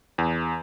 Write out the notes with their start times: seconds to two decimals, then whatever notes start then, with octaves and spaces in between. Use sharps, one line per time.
0.18 E2